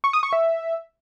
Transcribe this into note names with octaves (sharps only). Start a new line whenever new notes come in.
C#6
D#6
C#6
E5